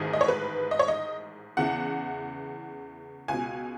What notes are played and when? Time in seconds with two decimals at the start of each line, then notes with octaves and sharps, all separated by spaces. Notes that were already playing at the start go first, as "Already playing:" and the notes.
Already playing: A1 G#2 D#3 G#4
0.13 D#5
0.21 C#5
0.28 B4
0.71 D#5
0.79 C#5
0.88 D#5
1.57 E2 C#3 E3 F#5
3.28 C#2 B2 G#5